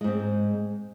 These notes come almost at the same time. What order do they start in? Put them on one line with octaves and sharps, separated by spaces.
G#3 G#2 C4